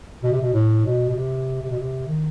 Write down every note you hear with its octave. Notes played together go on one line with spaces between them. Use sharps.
B2
C3
B2
A2
B2
B2
C3
C3
B2
C3
D#3